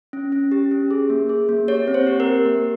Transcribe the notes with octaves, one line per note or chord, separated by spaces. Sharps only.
C#4
C#4
G4
C#4
G#4
A#3
G#4
A#3
G4 C#5
C4
C5
G4
A#4
G4
A#3